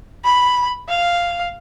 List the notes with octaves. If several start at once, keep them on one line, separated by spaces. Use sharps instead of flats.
B5
F5